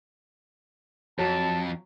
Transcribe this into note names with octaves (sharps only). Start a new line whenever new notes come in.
F2 F#3 A5